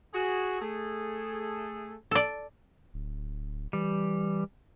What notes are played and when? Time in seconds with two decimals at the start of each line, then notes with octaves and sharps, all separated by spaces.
0.14 F#4 G#4
0.61 A3 G#4 A4
2.11 A4 D5
2.94 D1
3.73 E3 G3